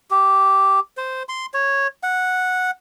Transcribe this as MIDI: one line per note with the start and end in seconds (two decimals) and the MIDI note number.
0.11 0.80 67
0.97 1.23 72
1.29 1.46 84
1.54 1.87 73
2.03 2.71 78